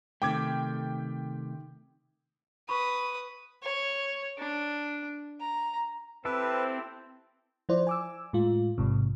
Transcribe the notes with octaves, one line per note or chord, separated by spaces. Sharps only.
C3 D#3 A3 G5 D6 G#6
B4 B5 C#6 D#6
C#5
D4
A#5
C4 E4 G4 A4 B4
F3 E4 C5 D5
G#5 D6 E6
A2 G#3 F4
A1 G#2 C3